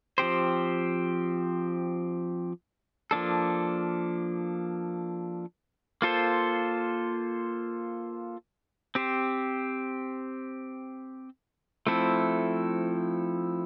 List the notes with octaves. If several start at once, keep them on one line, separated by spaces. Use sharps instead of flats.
F3 C4 G4 C5
F3 A#3 D4 A4
A#3 F4 A4 C5
C4 G4 C5
F3 A3 C4 E4 A4